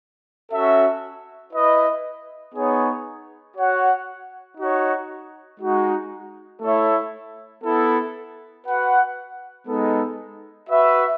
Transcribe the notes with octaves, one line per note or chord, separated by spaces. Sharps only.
C#4 F#4 A4 E5
E4 B4 D#5
B3 D#4 G#4 C#5
F#4 C#5 F#5
D#4 F#4 C#5
G#3 D#4 F#4
A3 E4 A4 C#5 E5
B3 E4 A4
F#4 B4 F#5
G#3 B3 D#4 A4
F#4 B4 E5